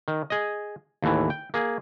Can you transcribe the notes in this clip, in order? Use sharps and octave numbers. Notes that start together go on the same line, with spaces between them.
D#3
G#4 D#5
D#2 A2 E3
G5
A#3 G#4